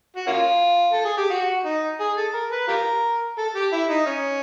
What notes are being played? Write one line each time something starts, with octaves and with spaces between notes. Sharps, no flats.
F#4
A#3 C#4 F4
A4
G#4
G4
F#4
D#4
G#4
A4
A#4
B4
F4 G4 A#4
A4
G4
E4
D#4
C#4